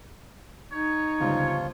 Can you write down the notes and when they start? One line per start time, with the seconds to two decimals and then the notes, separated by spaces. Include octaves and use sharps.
0.72 D#4 C#5
1.20 G1 C#2 F3 G3 F4